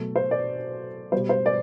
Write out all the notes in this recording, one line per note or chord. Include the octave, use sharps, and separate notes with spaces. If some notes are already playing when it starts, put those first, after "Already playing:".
Already playing: B2 F#3 A3
C5
D5
B2 G3 C5
C5
D5